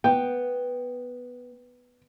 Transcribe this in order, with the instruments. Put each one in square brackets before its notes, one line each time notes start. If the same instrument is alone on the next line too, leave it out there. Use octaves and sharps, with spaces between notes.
[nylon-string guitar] B3 [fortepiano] G5